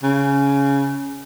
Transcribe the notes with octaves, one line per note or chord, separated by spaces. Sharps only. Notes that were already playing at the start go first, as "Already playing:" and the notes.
C#3